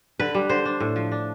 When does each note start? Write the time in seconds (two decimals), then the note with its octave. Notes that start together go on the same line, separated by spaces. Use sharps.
0.20 D3 B4
0.35 G3
0.49 D3 C5
0.65 D4
0.80 A2
0.96 F3
1.12 D4